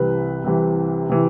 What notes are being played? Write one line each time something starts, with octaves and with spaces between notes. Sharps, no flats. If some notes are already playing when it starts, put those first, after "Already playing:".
Already playing: C2 C3 E3 B4
C2 C3 E3
C3 E3